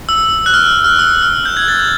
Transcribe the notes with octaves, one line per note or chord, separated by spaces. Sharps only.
E6
F#6
F6
F6
E6
F6
G6
G#6
A6
G6